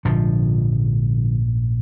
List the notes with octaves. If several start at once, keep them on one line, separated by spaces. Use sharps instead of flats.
A#1 G#2 D3 F3